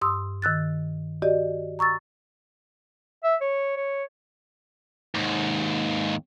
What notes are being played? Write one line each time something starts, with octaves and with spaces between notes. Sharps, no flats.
G2 C6 D#6 E6
D#3 E6 F#6 A6
F#4 G4 D5 D#5
A#5 C#6 E6 A6
E5
C#5
C#5
D#2 G#2